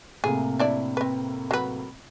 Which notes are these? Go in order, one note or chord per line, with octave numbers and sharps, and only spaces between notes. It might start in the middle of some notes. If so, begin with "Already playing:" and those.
A2 C3 A#3 G#4
D4 E4 D5
C4 B4
F#3 B4